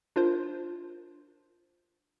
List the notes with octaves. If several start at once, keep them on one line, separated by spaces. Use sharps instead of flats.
D4 F4 A#4 C5